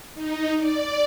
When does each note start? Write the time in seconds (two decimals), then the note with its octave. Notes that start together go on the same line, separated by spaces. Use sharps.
0.15 D#4
0.57 D5